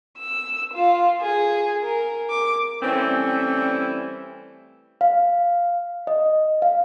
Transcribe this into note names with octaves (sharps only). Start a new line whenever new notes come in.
E6
F4
G#4
A#4
D6
E3 G3 A3 C4 C#4 E4
F5
D#5
F5